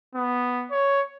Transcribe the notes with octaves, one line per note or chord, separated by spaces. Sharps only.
B3
C#5